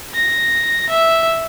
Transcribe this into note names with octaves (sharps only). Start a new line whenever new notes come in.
A#6
E5